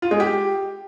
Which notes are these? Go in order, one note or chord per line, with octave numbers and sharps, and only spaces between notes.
F4
G#3
G4